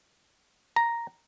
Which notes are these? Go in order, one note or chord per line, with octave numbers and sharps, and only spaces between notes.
A#5